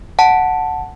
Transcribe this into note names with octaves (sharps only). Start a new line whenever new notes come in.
F#5 A5